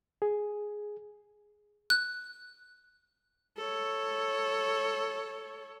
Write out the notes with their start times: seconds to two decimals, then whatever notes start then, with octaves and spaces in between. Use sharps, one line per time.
0.22 G#4
1.90 F#6
3.58 A4 C#5